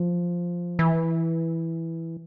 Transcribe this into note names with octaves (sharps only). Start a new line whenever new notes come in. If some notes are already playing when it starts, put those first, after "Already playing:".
Already playing: F3
E3